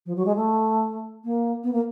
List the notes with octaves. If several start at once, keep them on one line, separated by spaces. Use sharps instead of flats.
F3
F#3
G#3
A3
A#3
B3
A#3